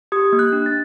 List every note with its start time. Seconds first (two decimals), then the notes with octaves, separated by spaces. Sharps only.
0.12 G4 D#6
0.33 A#3
0.39 F#6
0.53 D4
0.66 A6